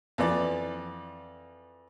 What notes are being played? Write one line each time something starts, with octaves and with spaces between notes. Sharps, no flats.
F2 E3 D5